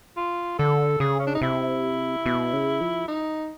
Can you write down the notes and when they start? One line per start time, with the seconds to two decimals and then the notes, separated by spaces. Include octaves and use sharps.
0.17 F4
0.58 D3 A4
1.00 C#3 G#4
1.19 C#4
1.27 D4
1.35 D#4
1.41 C3 E4
2.26 B2
2.53 C#3
2.81 F3
3.08 D#4